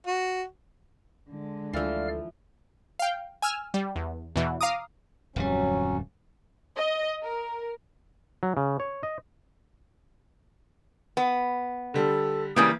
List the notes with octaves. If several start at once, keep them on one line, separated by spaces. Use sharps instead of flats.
F#4
D3 G#3
D2 E3 F3 A4 D5 F5 F6
F5 G5
G#5 E6 F6
G3
E2
E2 B2 E3
F5 A#5 D6 D#6
D1 F2 F#3 G3 C#4
D#5
A#4
F#3
C#3
C#5
D#5
B3
D3 G3 A4
C#3 E3 G3 A#3 C#4 D#6